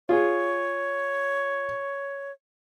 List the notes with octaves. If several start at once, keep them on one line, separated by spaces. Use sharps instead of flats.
F4 G#4 C#5